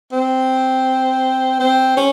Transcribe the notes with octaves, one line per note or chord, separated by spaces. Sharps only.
C4
C4
C#4